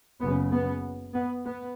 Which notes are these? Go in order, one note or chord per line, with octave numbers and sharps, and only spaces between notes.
F#1 F#2 C#3 B3
B3
B3
B3